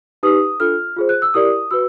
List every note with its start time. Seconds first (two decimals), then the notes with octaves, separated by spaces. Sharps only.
0.23 D#4 G4 B4 D#6
0.60 D4 F4 A4 F6
0.96 F4 G#4 C5
1.09 F#6
1.22 E6
1.34 E4 G4 A#4 D5 D#6
1.71 F#4 B4 E6